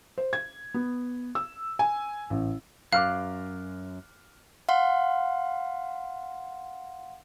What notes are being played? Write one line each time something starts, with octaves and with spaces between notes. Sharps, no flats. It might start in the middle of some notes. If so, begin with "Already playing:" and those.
C5
G#6
B3
E6
G#5
A1
F#2 F5 D6 F6 F#6
F5 F#5 C6